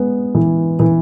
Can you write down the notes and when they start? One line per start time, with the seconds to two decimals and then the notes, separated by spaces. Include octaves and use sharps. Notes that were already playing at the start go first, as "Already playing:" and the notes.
Already playing: G#3 B3
0.35 E3
0.80 E3